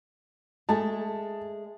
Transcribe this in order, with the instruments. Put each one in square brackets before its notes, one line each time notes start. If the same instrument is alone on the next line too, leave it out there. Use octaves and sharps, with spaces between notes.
[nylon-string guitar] G#3 A3 G#4 [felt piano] A5